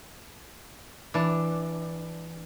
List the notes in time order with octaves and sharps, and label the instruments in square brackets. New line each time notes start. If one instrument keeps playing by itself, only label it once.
[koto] E3 D4